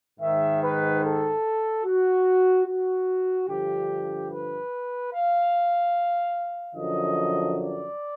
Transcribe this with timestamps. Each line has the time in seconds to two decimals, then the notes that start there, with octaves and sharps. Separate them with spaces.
0.20 G#2 D#3 E5
0.61 B4
1.02 A4
1.85 F#4
2.66 F#4
3.48 G2 D3 F3 G4
4.29 B4
5.11 F5
6.75 F#2 D3 F3 D#5
7.57 D5